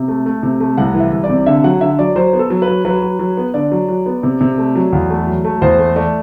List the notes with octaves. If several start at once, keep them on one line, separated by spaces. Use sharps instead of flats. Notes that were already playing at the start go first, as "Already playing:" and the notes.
Already playing: C3
A3
A3
C3
A3
C2 F#5
E3
E5
C2
D5
C3
D3 E5
F#3 F#5
D3 E5
F#3 D5
F#3 C5
B3
A4
F#3
B4
F#3
F#3 B4
F#3
F#3
B3
D3 D5
F#3
F#3
B3
C3
C3
A3
F#3
E2
A3
F#3
A3
E2 C5
A3
A3 D5